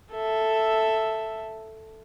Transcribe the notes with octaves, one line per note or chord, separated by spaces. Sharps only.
A4 E5